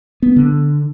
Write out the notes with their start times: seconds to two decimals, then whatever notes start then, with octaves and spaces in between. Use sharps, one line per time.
0.22 B3
0.36 D3